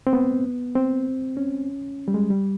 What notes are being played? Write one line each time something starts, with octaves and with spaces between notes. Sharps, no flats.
C4
B3
C4
C#4
G3
G#3
G3